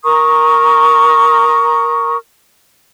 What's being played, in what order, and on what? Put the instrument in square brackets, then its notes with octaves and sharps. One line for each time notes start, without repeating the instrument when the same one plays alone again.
[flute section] A#4 A#5 C#6 D#6